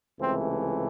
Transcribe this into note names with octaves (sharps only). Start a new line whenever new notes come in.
C#2 C3 E3 A3 C4